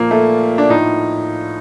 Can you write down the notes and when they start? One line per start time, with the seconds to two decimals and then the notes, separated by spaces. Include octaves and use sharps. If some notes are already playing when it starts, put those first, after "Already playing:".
Already playing: A#2 F3 A#3
0.11 A3
0.58 D4
0.70 A2 F3 D#4